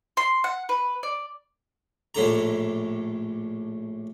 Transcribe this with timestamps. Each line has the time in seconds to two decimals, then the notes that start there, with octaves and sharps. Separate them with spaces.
0.17 C6
0.44 F#5
0.69 B4
1.03 D5
2.15 A#1 A2 D3 A#5